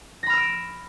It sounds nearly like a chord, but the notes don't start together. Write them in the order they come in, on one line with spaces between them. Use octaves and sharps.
A#6 B5 F6 E6 D7